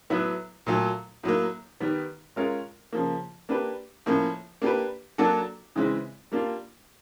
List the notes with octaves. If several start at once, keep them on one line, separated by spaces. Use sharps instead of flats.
A2 F#3 B3 E4
A#2 F#3 A3
A2 F#3 A#3
D#3 G3 B3
G#3 C#4 F4 A#4 C#5
C#3 F3 A#3
A#3 D4 G4 B4
A2 F3 A#3 C#4
A#3 D4 G4 B4
F#3 A#3 D4 F#4 A4
C#3 E3 G#3 C4 E4
G3 A#3 D4 F4